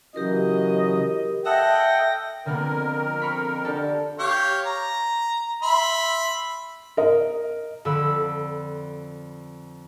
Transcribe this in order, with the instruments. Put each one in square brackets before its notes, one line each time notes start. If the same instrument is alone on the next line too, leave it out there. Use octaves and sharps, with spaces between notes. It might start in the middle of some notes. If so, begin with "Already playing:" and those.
[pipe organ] C#3 E3 F#3 [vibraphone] G4 A#4 [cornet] D#5
[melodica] A4 D#5 F#5 [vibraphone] E5 [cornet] G5 [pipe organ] A#6
[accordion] F2 A#4 [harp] D3 A#3 B3
[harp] B5 C#6 F6
[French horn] D3 [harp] G4 A4
[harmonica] G4 C#5 F5
A#5
E5 B5 C6
[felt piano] A#4 D#5
[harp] F2 D3 B5 E6